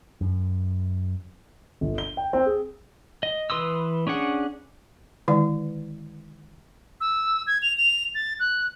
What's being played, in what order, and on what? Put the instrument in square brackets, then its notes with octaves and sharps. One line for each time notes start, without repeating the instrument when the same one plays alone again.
[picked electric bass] F#2
[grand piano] G1
G7
G5
C4
G#4
[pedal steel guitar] D#5
E3 B4 C6 D#6 E6
C#4 D4 G#4 F#5
[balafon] D3 D#3 G#3 E4 D5
[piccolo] E6
G#6
F7
F7
A6
F#6